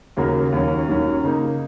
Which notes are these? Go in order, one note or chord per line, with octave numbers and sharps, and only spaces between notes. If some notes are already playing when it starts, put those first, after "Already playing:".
D#2 C#3 A#3 F#4 A#4
D#2 D#3 F#3 C#4
D#2 D#3 F#3 C#4
C#3 A#3 D#4